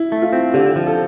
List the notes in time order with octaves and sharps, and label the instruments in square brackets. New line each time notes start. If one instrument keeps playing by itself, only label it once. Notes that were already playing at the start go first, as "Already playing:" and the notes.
Already playing: [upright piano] E4
[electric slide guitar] A3
[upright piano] F4
[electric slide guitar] C4
[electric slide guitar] D3 [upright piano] G4
[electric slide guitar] F3
[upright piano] A4